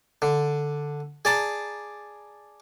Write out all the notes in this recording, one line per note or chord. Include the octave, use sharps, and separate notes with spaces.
D3
G#4 D5 A5 A#5